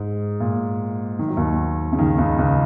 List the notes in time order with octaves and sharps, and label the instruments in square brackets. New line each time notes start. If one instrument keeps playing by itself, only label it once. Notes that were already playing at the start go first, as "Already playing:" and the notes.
Already playing: [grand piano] G#2
A#2
D#3
F#3
D#2 D#3
C#3
D#2 D#3
C#2 C#3
C#2 C#3